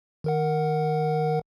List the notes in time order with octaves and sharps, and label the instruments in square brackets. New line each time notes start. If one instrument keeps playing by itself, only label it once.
[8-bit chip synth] D#3 A#4 F#5